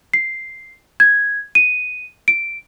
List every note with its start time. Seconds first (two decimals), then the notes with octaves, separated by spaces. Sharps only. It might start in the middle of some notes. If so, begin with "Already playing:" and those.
0.14 C7
1.00 G#6
1.55 D#7
2.28 D7